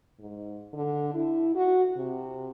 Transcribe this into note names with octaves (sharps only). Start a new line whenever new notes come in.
G#2
D3
E4
F#4
C3